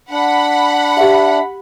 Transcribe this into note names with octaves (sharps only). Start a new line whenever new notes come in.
D4 F#5 B5
F#4 G4 E5